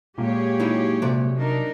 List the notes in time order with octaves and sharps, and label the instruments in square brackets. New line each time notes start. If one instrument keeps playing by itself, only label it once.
[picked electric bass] A#2 G#3 A#3 [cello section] G4 G#4 C#5
[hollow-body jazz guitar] F#3 D#4 E4
C3 F#3 D5
[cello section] D4 D#4 A#4